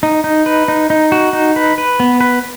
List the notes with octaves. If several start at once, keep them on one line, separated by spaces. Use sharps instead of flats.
D#4
D#4
B4
D#4
D#4
F#4
D#4
B4
B4
B3
B4